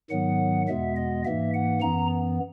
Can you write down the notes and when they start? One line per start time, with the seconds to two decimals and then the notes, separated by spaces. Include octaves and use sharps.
0.10 G#2 D#3 F#3 B3 F#5
0.68 E2 B2 G#3 B3 E5
0.96 D#5
1.25 G#2 E3 A#3 E5
1.54 F#5
1.82 F#2 E3 B3 A#5